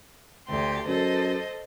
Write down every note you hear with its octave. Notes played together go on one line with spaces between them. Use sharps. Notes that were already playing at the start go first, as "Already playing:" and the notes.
D2 G4 C6
F#2 A4 C5 D#5